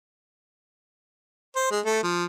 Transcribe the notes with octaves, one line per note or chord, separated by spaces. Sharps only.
C5
G#3
A3 A4
F3